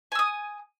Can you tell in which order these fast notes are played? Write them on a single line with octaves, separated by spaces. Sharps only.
G#5 E6 D#6